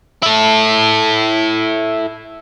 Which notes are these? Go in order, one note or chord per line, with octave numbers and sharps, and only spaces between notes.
E4 A4